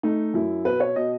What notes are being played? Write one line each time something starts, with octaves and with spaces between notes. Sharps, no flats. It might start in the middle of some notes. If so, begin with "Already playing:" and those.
A3 D#4
F#2 E4
B2 B4
C#5
B2 D#5